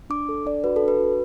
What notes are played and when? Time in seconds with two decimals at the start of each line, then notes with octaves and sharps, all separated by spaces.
0.10 D4 D6
0.29 A4
0.46 D4 D5
0.64 F#4 B4
0.76 A4
0.82 D4
0.88 B4
1.00 F#4